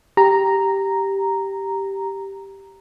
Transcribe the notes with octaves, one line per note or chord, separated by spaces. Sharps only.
G4 A#5